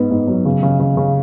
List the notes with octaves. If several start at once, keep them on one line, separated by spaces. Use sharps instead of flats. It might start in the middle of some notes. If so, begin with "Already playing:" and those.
Already playing: G#2 B3
G#2
F#3
C#3
C#3
C#3
C#3